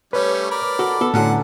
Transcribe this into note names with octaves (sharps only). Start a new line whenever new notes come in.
G3 A3 C#4 B4 C#5
A#4 D5 B5
F#4 A4
B3 A4
A2 D3 F#3 C#4 F#5